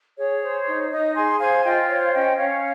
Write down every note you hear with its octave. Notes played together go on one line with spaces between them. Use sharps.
G#4 C#5
C5
D#4
D#4 D#5
G#4 G#5 C6
C5 F5 G#5
F4 D#5 G5
C5 C#5 F5
C#4 D#5 G5
C#4 C#5 F5